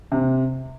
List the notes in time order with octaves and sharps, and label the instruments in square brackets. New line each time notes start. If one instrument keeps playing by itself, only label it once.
[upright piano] C3